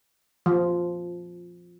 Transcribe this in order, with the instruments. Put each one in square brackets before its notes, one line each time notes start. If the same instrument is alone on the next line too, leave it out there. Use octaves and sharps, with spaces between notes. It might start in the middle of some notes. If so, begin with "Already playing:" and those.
[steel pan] F3